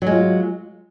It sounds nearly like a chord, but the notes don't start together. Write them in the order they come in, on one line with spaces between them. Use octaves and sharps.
F#3 G#3 F4